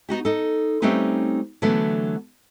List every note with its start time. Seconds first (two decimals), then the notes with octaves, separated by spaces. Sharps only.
0.09 B3 D#4 F#4 G4
0.25 D#4 A4
0.82 G3 A3 C4 C#4 D#4 B4
1.62 D3 E3 F#3 A3 B3